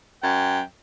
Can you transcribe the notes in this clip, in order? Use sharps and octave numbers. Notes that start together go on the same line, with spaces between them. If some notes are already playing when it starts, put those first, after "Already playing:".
F#2 G5